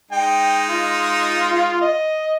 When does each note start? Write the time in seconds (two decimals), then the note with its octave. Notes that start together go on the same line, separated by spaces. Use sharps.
0.11 G#3 D#4 G5
0.69 F4
1.82 D#5